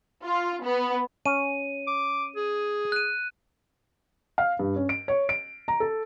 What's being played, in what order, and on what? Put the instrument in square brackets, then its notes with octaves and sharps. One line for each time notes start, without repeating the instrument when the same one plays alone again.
[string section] F4
B3
[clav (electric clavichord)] C#4 [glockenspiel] D#7
[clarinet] D6
G#4
[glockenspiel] F#6 D#7
[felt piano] F5
G2
C#4
D7
C#5
D7
A#5
A4